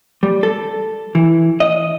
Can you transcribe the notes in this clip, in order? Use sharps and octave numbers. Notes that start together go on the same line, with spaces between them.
G3
A4
E3
D#5